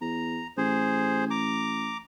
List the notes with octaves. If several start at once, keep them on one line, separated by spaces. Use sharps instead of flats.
E2 A#5
A1 G#4 C5
A#5 D6